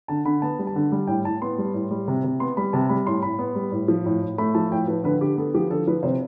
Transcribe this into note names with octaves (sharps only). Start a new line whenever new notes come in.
D3 A5
D3 B5
B3 A5
G3
A5
D3
G3
A2 G5
A2 A5
B3 C6
G3
A2
G3
C3
C3
B3 C6
G3 B5
C3 A5
G3 B5
A2 C6
A2 B5
B3
G3
A2
F3
A2
A2
A3 B5
F3 A5
A2 G5
F3 B4
D3 B4
D3 G4
B3 A4
F3 G4
D3 A4
F3 B4
C3 C5